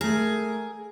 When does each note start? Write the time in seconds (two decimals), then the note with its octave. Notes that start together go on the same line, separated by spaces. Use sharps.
0.01 A3 G#4 A#4